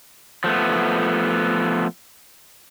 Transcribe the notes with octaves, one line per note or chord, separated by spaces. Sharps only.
F3 A3 B3